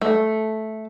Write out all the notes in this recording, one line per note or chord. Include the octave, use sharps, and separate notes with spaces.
A3